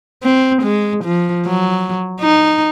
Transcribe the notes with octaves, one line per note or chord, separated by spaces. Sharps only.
C4
G#3
F3
F#3
D#4